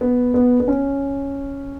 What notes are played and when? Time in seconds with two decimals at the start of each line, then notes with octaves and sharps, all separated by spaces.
0.01 B3
0.34 B3
0.60 B3
0.68 C#4